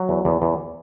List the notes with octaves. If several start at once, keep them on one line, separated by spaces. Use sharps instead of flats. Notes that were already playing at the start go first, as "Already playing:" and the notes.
Already playing: F#3
E2
E2
E2